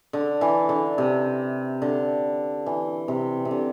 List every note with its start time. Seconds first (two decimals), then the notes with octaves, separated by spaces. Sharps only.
0.13 D3
0.41 E3
0.69 D3
0.98 C3
1.82 D3
2.66 E3
3.08 C3
3.45 C3
3.51 D3